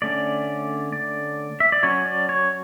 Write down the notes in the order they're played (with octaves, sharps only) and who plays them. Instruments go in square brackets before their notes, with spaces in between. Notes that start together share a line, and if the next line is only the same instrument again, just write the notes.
[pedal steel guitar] D3 A3 C#4 D5
D5
E5
D5
F#3 C#4 C#5
D5
C#5